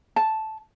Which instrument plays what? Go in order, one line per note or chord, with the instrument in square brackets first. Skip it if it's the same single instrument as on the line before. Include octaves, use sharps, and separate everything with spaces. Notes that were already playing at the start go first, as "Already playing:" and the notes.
[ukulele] A5